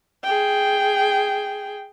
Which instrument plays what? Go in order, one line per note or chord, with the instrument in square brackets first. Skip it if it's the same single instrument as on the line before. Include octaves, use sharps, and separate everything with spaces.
[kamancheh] G#4 G5